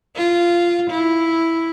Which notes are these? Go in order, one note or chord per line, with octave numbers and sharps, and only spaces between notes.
F4
E4